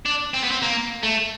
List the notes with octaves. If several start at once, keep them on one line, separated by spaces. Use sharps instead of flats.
D4
C4
B3
C4
A#3
A3